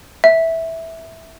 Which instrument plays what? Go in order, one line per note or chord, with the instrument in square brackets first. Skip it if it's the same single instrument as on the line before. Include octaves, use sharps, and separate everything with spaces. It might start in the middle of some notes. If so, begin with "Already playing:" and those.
[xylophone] E5